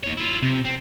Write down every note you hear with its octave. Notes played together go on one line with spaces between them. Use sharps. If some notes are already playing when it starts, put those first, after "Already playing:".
D#2 C#5
E4 F4
C3
C4